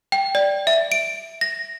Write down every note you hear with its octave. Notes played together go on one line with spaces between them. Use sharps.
G5
D5
E5
D7
A#6